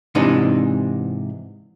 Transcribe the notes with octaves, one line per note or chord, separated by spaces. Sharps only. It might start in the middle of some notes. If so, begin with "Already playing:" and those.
G#2 C3 E3 D4 D#4